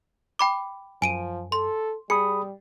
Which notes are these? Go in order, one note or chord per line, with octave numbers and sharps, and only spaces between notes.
G5 B5 D6
F#2 F3 G#5 D7 D#7
A4 C6
G3 G#4 B5 D#6 C#7